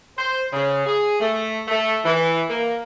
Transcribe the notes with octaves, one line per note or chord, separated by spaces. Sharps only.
C5
C#3
G#4
A3
A3
E3
A#3